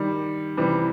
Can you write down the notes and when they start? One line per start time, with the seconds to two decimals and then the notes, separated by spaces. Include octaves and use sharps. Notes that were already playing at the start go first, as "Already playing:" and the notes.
Already playing: D#3 G3
0.57 C3 E3 G3